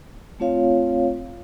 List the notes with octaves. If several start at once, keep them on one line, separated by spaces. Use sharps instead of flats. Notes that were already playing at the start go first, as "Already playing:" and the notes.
A3 C4 F4 C#5 F5